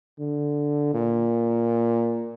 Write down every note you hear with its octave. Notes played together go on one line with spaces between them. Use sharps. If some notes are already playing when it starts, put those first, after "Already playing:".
D3
A#2